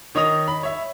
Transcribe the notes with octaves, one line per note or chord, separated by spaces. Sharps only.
D#3 C#5 D#5 D#6 F7
B5
C#5 E5